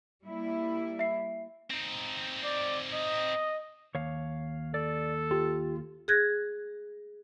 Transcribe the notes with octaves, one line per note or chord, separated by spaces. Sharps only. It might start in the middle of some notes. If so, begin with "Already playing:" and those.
G3 A#3 E4
E5 C7
C4 D#4
D5
D#5
D#2 C#5 F5
A4 D5
F4 G4
G#4 F#6 G#6 A#6